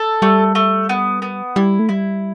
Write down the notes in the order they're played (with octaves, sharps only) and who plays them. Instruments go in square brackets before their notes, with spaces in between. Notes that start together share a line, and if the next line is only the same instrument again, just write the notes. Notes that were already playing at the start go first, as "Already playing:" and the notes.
Already playing: [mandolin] A4
[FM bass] G3 [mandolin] A3
[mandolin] A3
B3
B3
[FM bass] G3 [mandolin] E4
[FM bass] A3
[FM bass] G3 [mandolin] E4